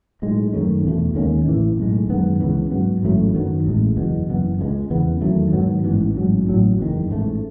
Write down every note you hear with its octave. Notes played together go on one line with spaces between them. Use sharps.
B1 A2 G#3
F#2 D#3 A3 C#4
E2 B2 A3
D#2 D#3 G#3 C#4
A1 A2 E3
B1 A2 G#3
F#2 D#3 G#3 B3
C#2 C#3 E3 B3
G#2 F#3 B3
A1 G#2 F#3 A3
F#2 D#3 F#3 B3
A1 A2 G#3
F#1 E2 B2
F#1 F#2 E3 B3
C#2 C#3 G#3
E2 C#3 E3 B3
E2 D#3 F#3 A3
G#2 D#3 F#3 B3
A1 G#2 E3 B3
A1 G#2 F#3
A1 A2 F#3
F#1 E2 D#3
A1 G#2 E3 A3